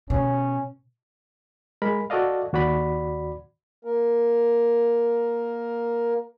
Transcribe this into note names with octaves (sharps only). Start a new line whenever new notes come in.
B2 C#4
G#3 A#4 B5
F#4 A4 D5 D#5 F5
D#2 F#4 D5 B5
A#3 A#4